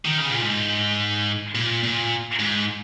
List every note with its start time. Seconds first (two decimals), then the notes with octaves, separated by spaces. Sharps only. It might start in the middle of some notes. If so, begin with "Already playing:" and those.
0.05 D#3
0.17 C#3
0.30 A#2
0.42 G#2
1.55 A#2
1.83 A#2
2.39 G#2